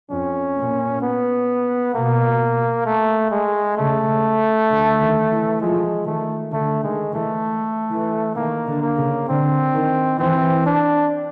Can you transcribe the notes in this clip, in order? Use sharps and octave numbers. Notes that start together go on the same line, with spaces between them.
F2 C#4
A#2
B3
B2 A#3
A3
G#3
C#3 A3
D3
D#3
E3
F3 G#3
D#3 A3
D3 A3
D#3 G#3
E3 A3
E3
D#3 A#3
D3
A#3
C#3
D3 C4
D#3
E3 C4
D4